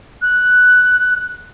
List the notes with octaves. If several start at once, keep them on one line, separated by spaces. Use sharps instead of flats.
F#6